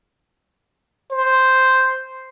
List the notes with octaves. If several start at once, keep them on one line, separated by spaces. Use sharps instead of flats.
C5